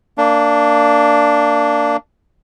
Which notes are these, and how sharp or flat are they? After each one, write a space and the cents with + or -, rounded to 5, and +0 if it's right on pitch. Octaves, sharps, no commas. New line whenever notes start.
A#3 -20 D4 +0